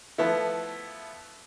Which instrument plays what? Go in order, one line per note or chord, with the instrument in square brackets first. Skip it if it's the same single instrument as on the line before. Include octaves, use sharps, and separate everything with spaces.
[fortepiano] F3 A3 B3 E4